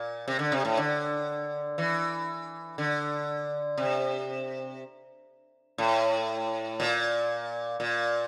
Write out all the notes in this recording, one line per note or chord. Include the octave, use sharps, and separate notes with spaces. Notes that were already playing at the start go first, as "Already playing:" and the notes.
Already playing: A#2
C3
D3
C3
A2
D3
E3
D3
C3
A2
A#2
A#2